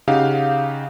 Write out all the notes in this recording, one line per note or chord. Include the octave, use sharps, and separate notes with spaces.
C#3 D#4 G4 F5 F#5